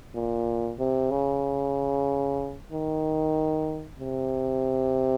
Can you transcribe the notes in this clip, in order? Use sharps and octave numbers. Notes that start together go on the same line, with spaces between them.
A#2
C3
C#3
D#3
C3